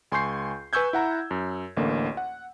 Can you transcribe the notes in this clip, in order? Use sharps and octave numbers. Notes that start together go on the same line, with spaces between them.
C#2 G#5 C6 C#6 G6 C7
B4 G#5 C#6 E6 G6 G#6
E4 F#5 A#5
F#2
A1 D2 D3 A#3
F#5